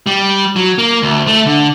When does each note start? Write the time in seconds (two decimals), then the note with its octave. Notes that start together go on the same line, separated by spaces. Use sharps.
0.06 G3
0.56 F#3
0.78 A#3
1.02 D2
1.27 A3
1.46 D3